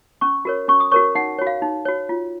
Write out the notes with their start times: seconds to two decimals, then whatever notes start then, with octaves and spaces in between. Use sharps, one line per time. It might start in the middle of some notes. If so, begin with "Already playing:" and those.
0.21 C#4 C#6
0.45 F#4 A#4 C#5
0.68 C#4 C#6
0.80 D#6
0.92 F#4 A#4 C#5 C#6
1.15 D#4 F#5
1.39 F#4 C#5
1.47 F5
1.62 D#4
1.85 F#4 C#5
2.09 F4